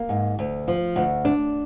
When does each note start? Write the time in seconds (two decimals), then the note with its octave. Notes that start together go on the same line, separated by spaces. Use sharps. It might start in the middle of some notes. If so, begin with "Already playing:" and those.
Already playing: A#3
0.09 G#2
0.39 D2
0.68 F3
0.96 D2
1.25 D4